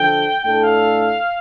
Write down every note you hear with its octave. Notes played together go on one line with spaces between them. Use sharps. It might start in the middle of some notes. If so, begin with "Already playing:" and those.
Already playing: D3 F3 D4 A4 G5
A2 A3 D4 A4 G5
F5